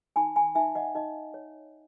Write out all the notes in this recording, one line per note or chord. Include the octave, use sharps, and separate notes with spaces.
D#4 G#5 B5
G#5 B5
D#4 E5 G#5
D#5 F#5
D#4 D#5
C#5